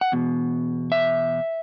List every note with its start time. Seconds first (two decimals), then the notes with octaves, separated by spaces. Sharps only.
0.01 F#5
0.12 E2 B2
0.92 E5